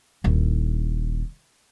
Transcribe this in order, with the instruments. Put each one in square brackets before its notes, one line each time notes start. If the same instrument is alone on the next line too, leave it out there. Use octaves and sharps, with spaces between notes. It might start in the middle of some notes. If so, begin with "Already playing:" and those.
[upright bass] D#1 E4